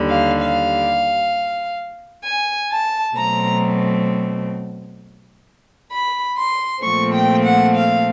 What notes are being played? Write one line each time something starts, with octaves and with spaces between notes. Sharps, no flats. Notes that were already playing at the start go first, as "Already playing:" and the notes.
Already playing: D#2 D3 G3
F5
F5
G#5
A5
B2 F#3 A3 C4 A#5
B5
C6
A#2 F3 A3 C4 C#6
G5
F#5
F5